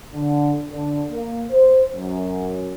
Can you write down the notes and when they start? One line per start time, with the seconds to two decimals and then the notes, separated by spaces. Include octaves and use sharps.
0.14 D3
0.72 D3
1.11 A#3
1.52 C5
1.94 F#2